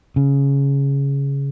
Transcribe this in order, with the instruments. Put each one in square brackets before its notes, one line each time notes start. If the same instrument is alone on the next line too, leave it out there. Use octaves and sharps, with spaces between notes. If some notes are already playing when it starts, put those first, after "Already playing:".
[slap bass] C#3